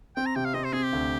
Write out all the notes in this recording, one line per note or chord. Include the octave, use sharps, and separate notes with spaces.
C4 G5
A#5
C3 G5
F5
C4 D#5
C5
C4 G#4
G4
D2